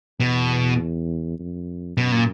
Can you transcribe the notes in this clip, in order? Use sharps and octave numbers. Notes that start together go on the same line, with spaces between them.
E2 B2
F2
F#2 B2
A#2